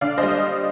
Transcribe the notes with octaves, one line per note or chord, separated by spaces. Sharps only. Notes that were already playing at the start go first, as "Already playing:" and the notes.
D3 D5 F5
C5 D#5
G3